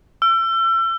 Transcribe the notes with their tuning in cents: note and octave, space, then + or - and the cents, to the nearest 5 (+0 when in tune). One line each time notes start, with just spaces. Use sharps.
E6 +35